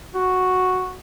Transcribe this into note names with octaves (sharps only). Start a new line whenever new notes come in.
F#4